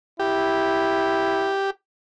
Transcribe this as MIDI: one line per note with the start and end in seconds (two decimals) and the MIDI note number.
0.20 1.57 64
0.20 1.70 67